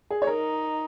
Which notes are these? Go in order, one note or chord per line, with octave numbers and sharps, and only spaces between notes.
G#4
C#5
D#4 A#4